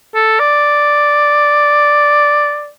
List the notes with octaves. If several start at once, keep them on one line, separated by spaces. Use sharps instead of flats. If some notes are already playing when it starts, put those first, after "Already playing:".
A4
D5